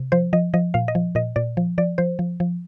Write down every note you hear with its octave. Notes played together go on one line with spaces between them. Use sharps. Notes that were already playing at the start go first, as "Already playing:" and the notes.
Already playing: C3
F3 C5
F3 D#5
F3 D#5
A#2 F5
D#5
F3
A#2 D#5
A#2 D5
F3
F3 D5
F3 C5
F3
F3